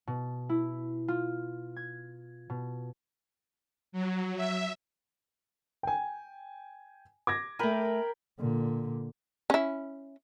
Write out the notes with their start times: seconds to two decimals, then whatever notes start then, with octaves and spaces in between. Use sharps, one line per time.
0.07 B2
0.49 E4
1.08 F4
1.76 G#6
2.50 B2
3.92 F#3
4.36 E5
5.83 G5 G#5
7.27 D6 G#6 A#6
7.59 A3 A#4 G5 G#5 B5
8.39 A#2 D3
9.50 C#4 E4